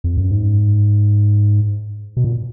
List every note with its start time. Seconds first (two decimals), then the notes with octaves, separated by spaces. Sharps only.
0.04 F2
0.17 F#2
0.30 G#2
2.17 B2
2.24 A#2